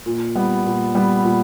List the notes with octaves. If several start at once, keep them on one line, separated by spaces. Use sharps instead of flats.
A#2
G3 B3
A#2
G3 B3
A#2